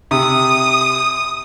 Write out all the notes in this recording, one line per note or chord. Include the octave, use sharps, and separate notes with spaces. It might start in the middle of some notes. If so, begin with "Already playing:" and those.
C3 D#6